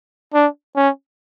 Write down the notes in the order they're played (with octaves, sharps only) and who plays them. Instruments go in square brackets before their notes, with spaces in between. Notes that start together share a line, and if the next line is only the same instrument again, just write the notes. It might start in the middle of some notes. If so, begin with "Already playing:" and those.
[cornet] D4
C#4